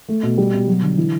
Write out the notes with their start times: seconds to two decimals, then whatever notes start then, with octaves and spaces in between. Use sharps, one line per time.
0.08 A3
0.23 B2
0.38 G3
0.54 B2
0.68 F#3
0.82 D3
0.97 E3